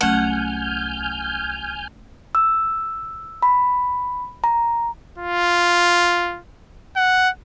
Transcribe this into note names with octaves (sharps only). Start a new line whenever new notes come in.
C2 F#3 A3 C#4 F#5 G#5 F6 G6
E6
B5
A#5
F4
F#5